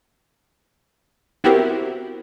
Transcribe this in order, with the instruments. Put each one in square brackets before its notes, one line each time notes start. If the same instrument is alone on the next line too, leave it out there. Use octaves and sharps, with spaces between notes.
[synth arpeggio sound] B3 C4 E4 F#4 G4 A#4